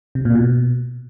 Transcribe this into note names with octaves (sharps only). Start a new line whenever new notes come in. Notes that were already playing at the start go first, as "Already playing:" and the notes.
C3
A#2
B2